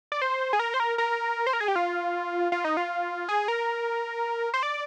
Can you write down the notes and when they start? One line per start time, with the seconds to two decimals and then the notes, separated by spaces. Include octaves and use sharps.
0.12 D5
0.22 C5
0.53 G#4
0.59 A#4
0.74 C5
0.80 A#4
0.98 A#4
1.47 C5
1.53 A#4
1.60 G#4
1.68 G4
1.76 F4
2.52 F4
2.64 D#4
2.77 F4
3.29 G#4
3.48 A#4
4.54 C5
4.63 D5